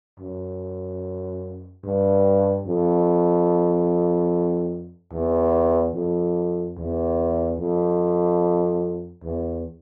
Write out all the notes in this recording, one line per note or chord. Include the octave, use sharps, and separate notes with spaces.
F#2
G2
F2
E2
F2
E2
F2
E2